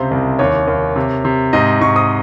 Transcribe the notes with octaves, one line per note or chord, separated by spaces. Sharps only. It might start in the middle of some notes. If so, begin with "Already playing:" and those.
Already playing: C#2 C3 C5
C2
D#2 C#5
D#2
C3
C3
G#2 D#5
G#2 C#6
D#6